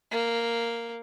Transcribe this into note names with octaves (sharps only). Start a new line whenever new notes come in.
A#3